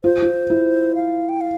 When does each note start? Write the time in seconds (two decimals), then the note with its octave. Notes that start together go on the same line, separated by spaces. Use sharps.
0.04 F4 C5
0.22 F4
0.50 E4
0.95 F5
1.29 G5
1.41 F5